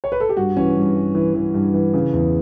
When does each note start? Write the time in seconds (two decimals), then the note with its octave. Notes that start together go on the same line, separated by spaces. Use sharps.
0.04 C#5
0.12 B4
0.20 A4
0.29 G4
0.37 G2 F#4
0.56 E3 C#4
0.76 G2
0.96 G2
1.15 E3
1.34 E3
1.54 G2
1.74 E3
1.94 C#3
2.14 E2